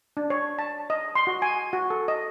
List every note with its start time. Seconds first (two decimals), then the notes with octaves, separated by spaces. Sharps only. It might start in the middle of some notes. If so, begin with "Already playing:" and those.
0.17 D4
0.30 C#5
0.59 A5
0.90 D#5
1.15 C6
1.27 F#4
1.42 G#5
1.73 F#4
1.90 A4
2.08 D#5